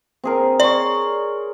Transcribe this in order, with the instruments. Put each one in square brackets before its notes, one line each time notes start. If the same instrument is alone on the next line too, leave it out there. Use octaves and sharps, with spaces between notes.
[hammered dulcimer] C4 G#4 A#4
[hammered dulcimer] C#5 C6 [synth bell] D5